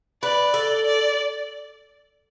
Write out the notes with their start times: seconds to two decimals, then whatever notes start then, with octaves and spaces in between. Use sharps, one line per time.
0.23 B4 D5
0.54 A4
0.86 D5